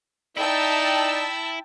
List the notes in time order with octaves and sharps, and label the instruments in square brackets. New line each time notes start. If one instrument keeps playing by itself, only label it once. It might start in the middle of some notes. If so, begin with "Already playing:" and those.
[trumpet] D#4 [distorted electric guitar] E4 [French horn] D5 [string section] G5 A5 E6